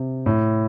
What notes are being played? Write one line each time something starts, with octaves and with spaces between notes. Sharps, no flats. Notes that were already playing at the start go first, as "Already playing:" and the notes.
Already playing: C3
A2